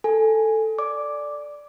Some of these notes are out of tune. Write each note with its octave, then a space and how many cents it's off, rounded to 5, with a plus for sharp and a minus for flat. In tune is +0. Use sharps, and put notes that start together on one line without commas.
A4 +5 G#5 +0
D5 +0 D6 +0